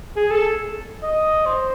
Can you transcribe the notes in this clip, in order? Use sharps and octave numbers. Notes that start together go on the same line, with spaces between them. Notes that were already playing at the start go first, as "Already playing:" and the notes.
G#4
A4
D#5
C5